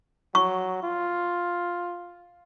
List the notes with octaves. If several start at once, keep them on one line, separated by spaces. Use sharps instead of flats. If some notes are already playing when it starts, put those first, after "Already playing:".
F#3 C#6
F4